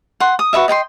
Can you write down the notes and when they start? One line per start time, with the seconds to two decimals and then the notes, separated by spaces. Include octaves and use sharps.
0.20 F#5 C6
0.39 D#6
0.53 F#4 B4 D#5 E5
0.68 D#5 G5 A#5 C6